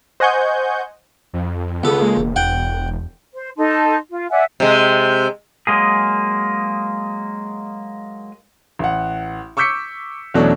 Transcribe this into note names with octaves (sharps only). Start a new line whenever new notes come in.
C5 D#5 F#5 G#5 C#6 G6
F2
C#2 B3 A4
G#3 A#3
E1
E2 F#5 G5
C5
D#4 A4 A5 C6
F4
D5 E5 F#5 G#5
C3 G#3
F#3 G#3 A#3 G#4
A1 F#5
C#6 D6 E6 G6 B6 C#7
E2 B2 F#3 A3 C#4 D4